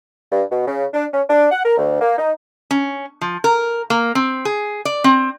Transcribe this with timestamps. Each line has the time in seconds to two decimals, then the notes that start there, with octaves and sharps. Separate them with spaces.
0.31 G2
0.51 B2
0.67 C#3
0.94 D4
1.12 C#4
1.28 D4
1.51 F#5
1.65 A#4
1.77 D2
2.01 A#3
2.18 D#4
2.71 C#4
3.21 F3
3.44 A#4
3.90 A#3
4.15 C4
4.45 G#4
4.85 D5
5.04 C4